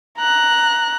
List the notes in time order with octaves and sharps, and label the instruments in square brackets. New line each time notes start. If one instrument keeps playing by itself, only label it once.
[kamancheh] A#5 F#6